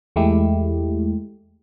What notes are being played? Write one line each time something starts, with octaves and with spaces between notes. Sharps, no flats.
E2 G#3 A3 E4 G4